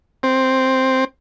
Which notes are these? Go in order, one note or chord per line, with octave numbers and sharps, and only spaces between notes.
C4